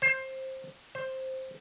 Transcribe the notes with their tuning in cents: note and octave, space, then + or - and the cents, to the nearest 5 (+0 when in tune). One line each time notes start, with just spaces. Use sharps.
C5 +15
C5 +5